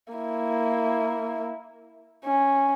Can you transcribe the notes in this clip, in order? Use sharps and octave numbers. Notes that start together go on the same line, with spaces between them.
A#3 E4
C#4